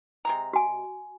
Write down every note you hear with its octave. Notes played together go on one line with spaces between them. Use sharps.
C3 G#3 A#5
F#4 G#5